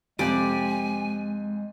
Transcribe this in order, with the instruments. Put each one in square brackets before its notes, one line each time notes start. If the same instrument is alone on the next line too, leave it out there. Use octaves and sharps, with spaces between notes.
[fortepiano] F2 C3 [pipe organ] G#3 [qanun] G4 D5 [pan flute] G#5